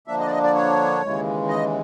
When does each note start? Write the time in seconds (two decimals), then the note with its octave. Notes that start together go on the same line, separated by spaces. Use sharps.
0.07 D3 F3 A#3 D4 E5
0.20 D#5
0.26 D5
0.31 D#5
0.43 D5
0.55 C#5
1.02 D#2 C#3 E3 G#3
1.48 D#5